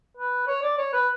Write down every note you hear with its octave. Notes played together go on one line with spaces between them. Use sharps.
B4
C#5
D5
C#5
B4